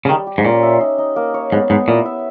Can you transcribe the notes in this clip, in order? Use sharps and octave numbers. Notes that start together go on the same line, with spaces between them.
C#3
D#3 G3
G4
G#2
A#2 C#4
E5
D#4
D#4
A#3
C#5
G#2 B3
G#2 B3
A#2 E4
E5